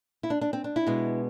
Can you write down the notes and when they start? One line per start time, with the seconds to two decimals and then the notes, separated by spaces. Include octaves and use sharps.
0.23 E4
0.30 D4
0.41 D4
0.53 C4
0.64 D4
0.76 E4
0.87 B2 G#3 B3